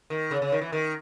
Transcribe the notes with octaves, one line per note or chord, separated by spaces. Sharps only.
D#3
C#3
C#3
D#3
E3
D#3